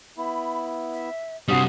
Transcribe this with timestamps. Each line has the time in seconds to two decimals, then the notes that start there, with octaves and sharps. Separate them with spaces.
0.18 B3 E4 B5
0.93 E5
1.48 G2 C3 G3 F#4 C5 D#6 C7